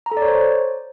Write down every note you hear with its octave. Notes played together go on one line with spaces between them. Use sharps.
A#5
A4
D5
C#5
C5